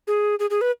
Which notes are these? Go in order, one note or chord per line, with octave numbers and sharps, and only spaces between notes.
G#4
G#4
G#4
B4